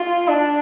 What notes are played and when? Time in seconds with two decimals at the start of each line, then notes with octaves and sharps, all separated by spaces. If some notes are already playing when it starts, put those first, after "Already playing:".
Already playing: F4
0.28 D4